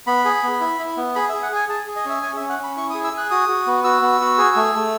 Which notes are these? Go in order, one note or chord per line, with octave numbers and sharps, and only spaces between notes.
B3 B5
G#4
B3
E4
E4
B3
G#4 B5
G#4 E5
F#5
G#4 G#5
G#4 A5
G#4
D#5
C#4 E5
C#4 G#5
C#4 E5
F#5
C#4 B5
E4 C#6
D#6
G#4
E6
G#4 F#6
F#4 D#6
F#4
B3
F#4 E6
B3
F#4
G#4
A3
A3